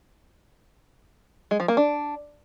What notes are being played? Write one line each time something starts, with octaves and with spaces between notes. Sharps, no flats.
G#3
F3
A#3
D4